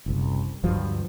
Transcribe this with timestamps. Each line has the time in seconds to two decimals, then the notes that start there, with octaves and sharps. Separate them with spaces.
0.06 F#1 C2
0.64 D2 G2 F3 F#3